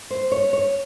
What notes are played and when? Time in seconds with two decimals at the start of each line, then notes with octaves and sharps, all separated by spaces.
0.10 C5
0.32 C#5
0.53 C#5